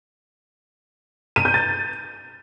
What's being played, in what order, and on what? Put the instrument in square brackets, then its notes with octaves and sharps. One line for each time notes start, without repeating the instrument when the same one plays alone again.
[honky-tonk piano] D#7
G6
A6